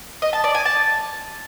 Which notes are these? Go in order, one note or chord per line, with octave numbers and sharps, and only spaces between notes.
D#5
A5
D5
G#5
A5